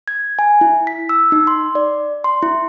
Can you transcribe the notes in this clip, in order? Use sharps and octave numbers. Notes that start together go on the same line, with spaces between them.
G#6
G#5
E4
B6
E6
D#4
C6
D5
C6
E4